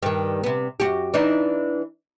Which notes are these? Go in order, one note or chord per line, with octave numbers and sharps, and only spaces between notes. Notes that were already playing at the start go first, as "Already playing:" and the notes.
G2 D#3
C3 B3
F#2 F#4 G4
E3 D4 D#4